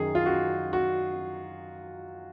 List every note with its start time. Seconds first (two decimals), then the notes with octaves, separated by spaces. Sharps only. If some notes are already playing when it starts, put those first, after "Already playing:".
Already playing: F#2 D#3 G#4
0.15 F4
0.26 F#4
0.73 F#4